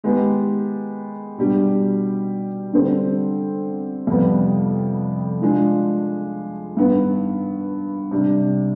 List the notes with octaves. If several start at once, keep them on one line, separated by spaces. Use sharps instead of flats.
D#3 G#3 B3 D#4 G4
B2 G3 D4 G4
D3 G3 C4
F2 C3 G3 B3
F3 G#3 D4
G2 D#3 B3
C3 G3 D4